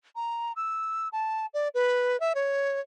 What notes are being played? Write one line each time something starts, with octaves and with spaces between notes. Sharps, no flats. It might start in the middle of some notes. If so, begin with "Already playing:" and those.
A#5
E6
A5
D5
B4
E5
C#5